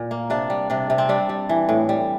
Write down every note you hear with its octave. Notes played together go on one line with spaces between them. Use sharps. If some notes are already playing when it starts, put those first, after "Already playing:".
Already playing: A#2
A#3
C3 D4
G3
C3 D4
C3
C4
G3 D4
G3
E3
A2
G3